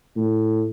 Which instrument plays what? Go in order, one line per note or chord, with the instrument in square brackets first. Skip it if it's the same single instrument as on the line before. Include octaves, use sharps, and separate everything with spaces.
[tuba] A2